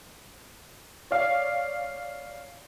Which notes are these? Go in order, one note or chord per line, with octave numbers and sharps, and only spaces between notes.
C#5 D5 F5